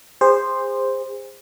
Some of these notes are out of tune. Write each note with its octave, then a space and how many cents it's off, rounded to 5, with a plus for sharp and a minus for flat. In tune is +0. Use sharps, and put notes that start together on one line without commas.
G#4 -40 C5 +0